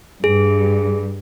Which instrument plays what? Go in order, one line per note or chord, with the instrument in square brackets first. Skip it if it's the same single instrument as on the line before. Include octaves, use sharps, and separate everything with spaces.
[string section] G2 [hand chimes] G#4